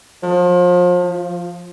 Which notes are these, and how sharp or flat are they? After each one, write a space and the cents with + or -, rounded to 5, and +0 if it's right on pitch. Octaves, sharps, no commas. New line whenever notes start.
F3 +35
F3 -5